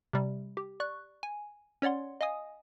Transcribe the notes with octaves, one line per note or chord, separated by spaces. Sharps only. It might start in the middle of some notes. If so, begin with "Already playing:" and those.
C3 G3
G4
D5 C#6 F#6
G#5
C#4 C#5 D5 F#5 C6
D#5 F5 G#5 D#6